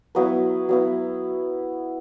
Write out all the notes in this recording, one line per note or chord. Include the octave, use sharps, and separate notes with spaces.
F#3 B3 E4 B4
F#3 B3 E4